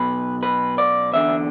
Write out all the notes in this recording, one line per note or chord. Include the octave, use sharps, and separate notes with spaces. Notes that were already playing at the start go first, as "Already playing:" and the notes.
Already playing: B1 B2 B4
B4
D5
E2 D3 E5